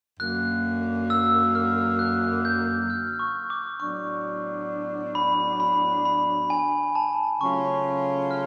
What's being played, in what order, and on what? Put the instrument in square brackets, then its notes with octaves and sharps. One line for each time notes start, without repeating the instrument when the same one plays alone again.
[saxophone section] F#2 D3 F#3 A#3 [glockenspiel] F#6
[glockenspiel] E6
F6
F#6
G6
F6
C#6
D6
[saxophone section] A2 F#3 B3 D4 [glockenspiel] C#6
[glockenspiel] B5
B5
B5
G#5
A5
[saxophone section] C#3 F#3 A3 C#4 F4 [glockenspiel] C#6
[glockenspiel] F6